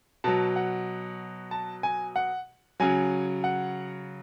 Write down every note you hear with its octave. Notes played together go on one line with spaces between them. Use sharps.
B2 F#3 A5
F#5
A5
G#5
F#5
C#3 F#3 G#5
F#5